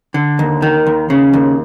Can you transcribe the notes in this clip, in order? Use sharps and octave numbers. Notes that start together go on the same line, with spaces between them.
D3
D#2
D#3
D#2
C#3
D#2